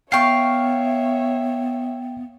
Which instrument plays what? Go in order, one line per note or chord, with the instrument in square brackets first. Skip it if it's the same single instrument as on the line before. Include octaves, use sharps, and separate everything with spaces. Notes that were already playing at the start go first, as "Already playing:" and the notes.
[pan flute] B3 [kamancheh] C#5 E5 [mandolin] F5 C#6 [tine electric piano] G5 C7